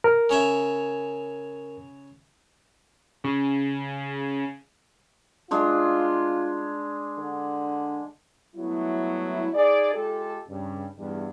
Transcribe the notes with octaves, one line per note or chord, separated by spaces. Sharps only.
A#4
C#3 C#4 E5
C#3
G#3 D4 F4
D3
F#3 G3 A3 B3 E4
D#4 G#4 D5
G#3 F4 G4 A4
G2 C#3
E2 G2